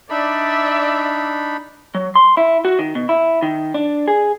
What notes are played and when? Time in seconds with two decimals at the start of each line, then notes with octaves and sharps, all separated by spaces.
0.10 D4 D#4 D5 E5 B5
1.95 F#3
2.15 C6
2.37 E4
2.65 F#4
2.79 D#3
2.95 B2
3.09 E4
3.42 D#3
3.74 D4
4.08 G#4